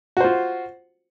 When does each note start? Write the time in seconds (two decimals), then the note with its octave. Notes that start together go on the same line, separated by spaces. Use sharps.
0.17 F#4
0.21 C5
0.24 F4